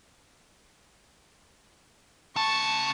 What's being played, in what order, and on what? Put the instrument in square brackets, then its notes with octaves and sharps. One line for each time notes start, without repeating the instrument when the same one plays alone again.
[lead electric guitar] C#3 A5 [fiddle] C#6